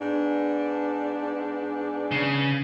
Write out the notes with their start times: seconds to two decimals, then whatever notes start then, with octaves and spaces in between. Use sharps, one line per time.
0.01 G#2 B3 D4
2.11 C#3